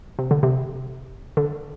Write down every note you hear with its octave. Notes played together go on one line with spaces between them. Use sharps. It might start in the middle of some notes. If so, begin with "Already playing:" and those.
C3
D3
C3
D3